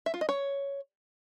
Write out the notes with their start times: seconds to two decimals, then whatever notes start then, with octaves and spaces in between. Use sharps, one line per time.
0.06 E5
0.14 F4
0.21 D#5
0.29 C#5